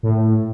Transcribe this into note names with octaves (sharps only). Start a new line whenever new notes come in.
A2